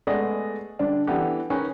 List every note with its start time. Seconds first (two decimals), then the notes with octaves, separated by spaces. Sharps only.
0.07 G#3 A3 B3 G#4 D5 D#5
0.79 D3 G3 D4
1.07 E3 B3 D4 E4 G4 A4
1.50 C#4 D#4 G#4 A#4 B4